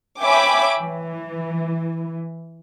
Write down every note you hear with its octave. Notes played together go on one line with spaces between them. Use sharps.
C#5 E5 G5 G#5 B5 D6
E3